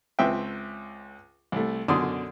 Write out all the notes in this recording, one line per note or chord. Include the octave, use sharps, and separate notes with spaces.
C#2 C4 B4 E5 G5
C2 A3
F#2 B2 D3 D5 C6 D#6